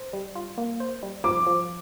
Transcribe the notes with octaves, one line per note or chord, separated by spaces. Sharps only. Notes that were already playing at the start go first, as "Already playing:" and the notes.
Already playing: C5
G3
F4
A#3
C5
G3
F3 D6
F3